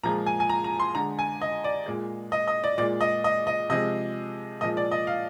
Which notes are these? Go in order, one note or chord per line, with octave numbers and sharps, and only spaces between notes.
A#2 F3 G#3 A#5
G#5
G#5
A#5
A#5
C6
D3 G#3 A#5
G#5
D#5
D5
A#2 G#3
D#5
D#5
D5
A#2 G#3 D5
D#5
D#5
D#5
C3 F3 G#3 D#5
A#2 F3 G#3 D#5
D5
D#5
F5